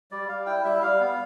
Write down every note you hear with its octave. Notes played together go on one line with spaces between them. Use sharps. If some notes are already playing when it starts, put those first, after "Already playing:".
G3 D5
G3 F5
E4 G5
G3 E5
G3 F5
B3